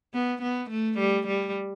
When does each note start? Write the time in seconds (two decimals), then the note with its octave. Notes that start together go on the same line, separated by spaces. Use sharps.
0.13 B3
0.42 B3
0.70 A3
0.98 G3
1.27 G3